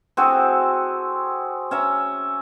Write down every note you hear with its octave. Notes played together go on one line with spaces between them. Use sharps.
C4 F#4 G#4 A4
C#4 E5 A#5